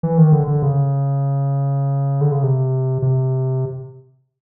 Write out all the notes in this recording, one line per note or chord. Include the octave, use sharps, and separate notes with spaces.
E3
D#3
D3
D3
C#3
D3
C#3
C3
C3